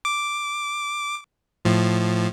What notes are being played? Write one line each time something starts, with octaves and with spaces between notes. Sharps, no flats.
D6
A2 F3